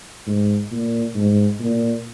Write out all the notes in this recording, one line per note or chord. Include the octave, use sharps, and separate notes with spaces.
G#2
A#2
G#2
A#2